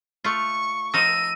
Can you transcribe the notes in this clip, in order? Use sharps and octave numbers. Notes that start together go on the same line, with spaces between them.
A3 F4 C#6
F3 D#4 E6 A#6 D#7